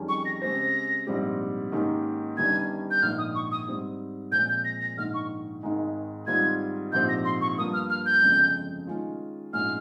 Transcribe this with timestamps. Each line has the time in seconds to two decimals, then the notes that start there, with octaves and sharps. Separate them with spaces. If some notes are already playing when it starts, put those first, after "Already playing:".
Already playing: F2 D#3 G3 C#4 G#4
0.09 C#6
0.25 A#6
0.42 C#3 G#3 C4 G4 C5 A#6
1.07 A#1 G#2 G3 C4 G4
1.72 G#2 D#3 A#3 C#4 G4
2.37 G1 G2 D#3 G3 C#4 G#6
2.91 G6
3.02 A#1 G#2 D#3 F6
3.18 D#6
3.35 C#6
3.51 D#6
3.67 G#2 G3 C4
4.32 A#2 F3 G#3 C4 G6
4.49 G6
4.65 A#6
4.81 A#6
4.97 A#1 G#2 D#3 F6
5.14 C#6
5.63 G#1 G#2 D#3 G#3 D#4
6.27 G#2 D#3 G3 C4 F4 G#6
6.92 A#1 G#2 F3 C4 G4 G6
7.09 A#6
7.25 C6
7.41 C#6
7.58 G2 F3 A#3 D#6
7.73 F6
7.90 F6
8.06 G6
8.22 G1 F2 C#3 F3 G#3
8.87 D#3 G#3 C#4 F4
9.53 A#1 G#2 F3 G#3 C#4 F6